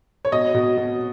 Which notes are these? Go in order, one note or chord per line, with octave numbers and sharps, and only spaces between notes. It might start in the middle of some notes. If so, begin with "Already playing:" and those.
C#5
B2 D#5
B2
B2